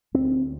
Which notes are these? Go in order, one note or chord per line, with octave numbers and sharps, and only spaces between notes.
D2 C4